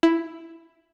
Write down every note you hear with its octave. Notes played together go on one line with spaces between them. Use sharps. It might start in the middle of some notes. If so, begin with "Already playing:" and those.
E4